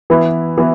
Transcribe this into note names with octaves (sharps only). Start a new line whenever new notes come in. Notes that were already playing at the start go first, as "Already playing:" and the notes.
E3 B3 E4
E3 B3 E4